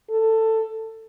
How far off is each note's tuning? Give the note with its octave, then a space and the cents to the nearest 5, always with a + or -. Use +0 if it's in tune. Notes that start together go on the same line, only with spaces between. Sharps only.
A4 +15